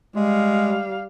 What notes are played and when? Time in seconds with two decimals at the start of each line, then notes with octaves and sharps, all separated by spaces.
0.16 G3 G#3 F5